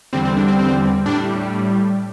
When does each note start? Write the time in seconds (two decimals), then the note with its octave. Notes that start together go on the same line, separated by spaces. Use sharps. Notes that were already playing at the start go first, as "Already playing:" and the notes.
0.13 E2 D3 G3 C4
0.25 C4
0.37 D4
0.48 C4
0.59 C4
1.06 A2 G3 D4